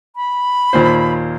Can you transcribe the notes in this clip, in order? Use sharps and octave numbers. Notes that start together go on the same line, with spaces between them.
B5
D#2 A#2 C5